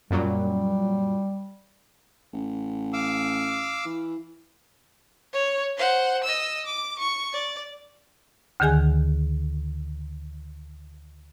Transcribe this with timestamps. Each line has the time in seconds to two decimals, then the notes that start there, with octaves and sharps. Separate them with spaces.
0.10 F#2 A#2 F#3 G3
2.33 A1
2.93 F5 D6 E6
3.85 E3
5.33 C#5
5.78 C5 F#5
6.24 D#5 E6
6.66 D6
6.99 C#6
7.33 D5
8.60 D2 D3 D#3 G#4 G#5 F#6